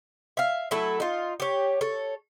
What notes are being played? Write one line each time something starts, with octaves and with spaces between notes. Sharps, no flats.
E5 F5
F#3 A3 E4 A4
D#4 F4
G4 C#5
A4 C#5